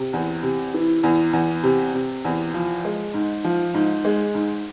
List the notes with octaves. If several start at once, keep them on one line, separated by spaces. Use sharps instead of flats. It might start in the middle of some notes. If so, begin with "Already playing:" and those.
Already playing: C3
E2
C3
E3
E2
E2
C3
C3
E2
F3
G#3
G#2
F3
G#2
G#3
G#2